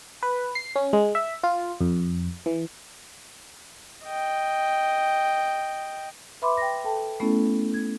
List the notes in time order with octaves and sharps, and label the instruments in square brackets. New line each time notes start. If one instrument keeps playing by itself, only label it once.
[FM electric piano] B4
C7
C#4
G#3
E5
F4
F2
E3
[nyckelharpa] D#5 G5
[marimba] B4 E5 B5 C6 D6
G5 A#6
A4 G5 A5
A3 B3 C#4 E4 A4
G#6